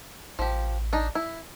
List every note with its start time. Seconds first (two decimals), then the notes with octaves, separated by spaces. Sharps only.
0.39 A1 F3 G4
0.93 D4 D#4
1.15 E4